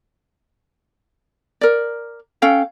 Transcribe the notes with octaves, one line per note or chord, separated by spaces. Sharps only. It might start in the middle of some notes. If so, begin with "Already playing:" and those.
A#4 D5
C#4 A4 F5 G5